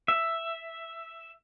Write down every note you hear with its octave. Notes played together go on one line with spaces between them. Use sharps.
E5